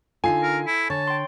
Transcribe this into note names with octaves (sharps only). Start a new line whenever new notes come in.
D3 D#4 F4 A4 G#5 C7
A#4
E4
D3 C#5 A5 C#6 A6
G5 C6